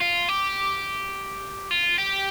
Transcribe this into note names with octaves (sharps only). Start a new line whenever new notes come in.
F4
G4
F4
G4